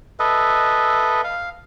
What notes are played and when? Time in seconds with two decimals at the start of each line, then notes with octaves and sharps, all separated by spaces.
0.20 A4 B4 D#5 E5
1.24 F5